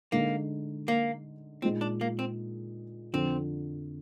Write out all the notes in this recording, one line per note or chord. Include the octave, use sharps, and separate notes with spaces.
D3 G#3 A#3 D#4
A#3
A#2 G#3 C4 D#4
D4
A#3
C4
F2 D3 F3 C4